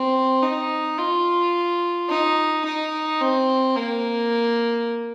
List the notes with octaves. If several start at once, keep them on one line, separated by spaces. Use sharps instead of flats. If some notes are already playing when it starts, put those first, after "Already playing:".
Already playing: C4
D#4
F4
D#4
D#4
C4
A#3